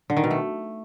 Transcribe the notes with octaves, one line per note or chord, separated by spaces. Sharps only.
D3
D#3
B2
A3